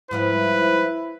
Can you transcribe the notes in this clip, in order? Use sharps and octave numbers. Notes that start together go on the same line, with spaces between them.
G#2 F3 G3 E4 B4